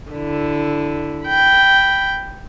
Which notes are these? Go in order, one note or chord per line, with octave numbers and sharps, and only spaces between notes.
D3 E4
G5 B5